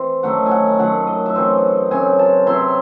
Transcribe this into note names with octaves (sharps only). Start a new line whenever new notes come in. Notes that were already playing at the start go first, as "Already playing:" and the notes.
Already playing: E3 C4
F#2 D#3 A3 F#5
G#5
F#5
F#2 D#3 A3 F#5
D#5
E5
F#2 C#3 E3 C4 D#5
F#2 C#3 E3 C4 G#5
A5
C3 F#3 C4 E4 C6